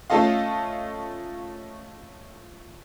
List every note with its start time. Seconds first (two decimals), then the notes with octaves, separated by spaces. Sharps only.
0.10 A3 C#4 F4 A4 D#5 F5